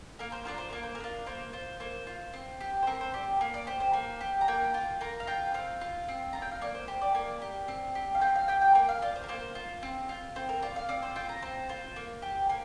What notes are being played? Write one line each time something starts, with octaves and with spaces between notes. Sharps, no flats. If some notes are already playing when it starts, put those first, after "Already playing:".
A#3 A#4
C5
D4 F4 A#4
C5
A#3 A#4
C5
A#4
D4 F4
A#3 C5
F4 C5
A#3 C5
F4
C4
G4
C5
C4 A#4
C5
G4 D5
A#3
D5
G4 C5
C5
A#3
G4
A#5
A#3 G5
F4
A#3 A#5
F5
F4 G5
C4 F5
F4
C4
F4 A#5
G5
F5
A#3 D5
C5
G4 C5
D5
A#3
G4
C4
G4
F5
C4 G5
F5
G4 G5
G5
A#3 G5
F5
F4 D5
C5
A#4
A#3 C5
F4
C4
F4
C4 C5
A#4
F4 D5
F5
C4 D5
C5
F4 G5
A#5
C4 C5
F4 C5
A#3
G4
A#3